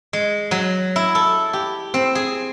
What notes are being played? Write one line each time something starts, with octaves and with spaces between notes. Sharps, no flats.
G#3
F#3
E4
A4
G4
C4
G#4